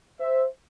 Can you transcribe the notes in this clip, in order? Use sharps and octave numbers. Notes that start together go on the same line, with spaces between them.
C5 E5